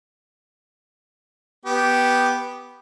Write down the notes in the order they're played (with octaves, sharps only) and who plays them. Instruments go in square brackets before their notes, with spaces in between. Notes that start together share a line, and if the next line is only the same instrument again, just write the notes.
[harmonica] B3 G4